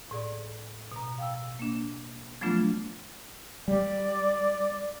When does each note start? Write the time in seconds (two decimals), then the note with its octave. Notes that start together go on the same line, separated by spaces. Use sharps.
0.11 A2 G#4 D5
0.92 B2 A#5
1.18 F5 G5 E6
1.59 A#3 D4
2.41 F3 F#3 A3 B3 D4 F4
3.68 G3 D5